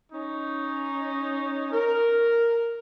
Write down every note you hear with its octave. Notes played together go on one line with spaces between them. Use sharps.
C#4 D#4
A#4